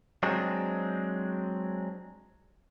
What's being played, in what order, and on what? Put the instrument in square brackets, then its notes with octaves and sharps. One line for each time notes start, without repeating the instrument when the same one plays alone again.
[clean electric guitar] F#3 G#3 C4 D4